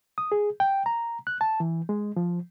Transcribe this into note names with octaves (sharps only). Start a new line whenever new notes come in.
D#6
G#4
G5
A#5
F#6
A5
E3
G#3
F3